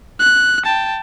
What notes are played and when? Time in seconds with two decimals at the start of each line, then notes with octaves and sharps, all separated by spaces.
0.20 F#6
0.66 G5 A5